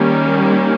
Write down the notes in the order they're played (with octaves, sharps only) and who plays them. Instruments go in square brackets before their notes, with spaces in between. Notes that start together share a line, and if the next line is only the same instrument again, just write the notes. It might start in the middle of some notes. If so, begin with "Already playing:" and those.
Already playing: [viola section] D#3 G3 A#3 C#4